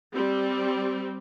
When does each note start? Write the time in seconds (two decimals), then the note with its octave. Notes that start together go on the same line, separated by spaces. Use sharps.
0.13 G3 C4